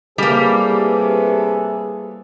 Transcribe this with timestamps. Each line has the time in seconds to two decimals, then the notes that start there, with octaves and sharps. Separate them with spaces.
0.18 A2 C3 G3 A#3 G#4 A4 B4